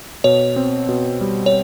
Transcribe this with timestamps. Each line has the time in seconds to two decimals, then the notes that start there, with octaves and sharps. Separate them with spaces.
0.24 B2 C#5
0.56 C4
0.89 B2
1.21 G3
1.46 C#5